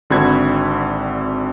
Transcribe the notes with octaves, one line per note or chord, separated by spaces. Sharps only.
G#1 D3 C4 F#4 B5 G#6